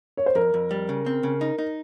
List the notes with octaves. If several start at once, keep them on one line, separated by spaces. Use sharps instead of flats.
C#5
C5
F2 A#4
F2
G3
C#3
C4
C#3
D#4
D#4